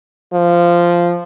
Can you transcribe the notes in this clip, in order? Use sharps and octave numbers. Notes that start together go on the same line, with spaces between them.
F3